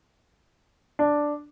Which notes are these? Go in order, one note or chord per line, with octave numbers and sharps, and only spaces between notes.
D4